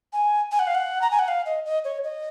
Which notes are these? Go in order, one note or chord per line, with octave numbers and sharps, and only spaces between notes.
G#5
G#5
F#5
F5
F#5
A#5
G#5
F#5
F5
D#5
D#5
C#5
D#5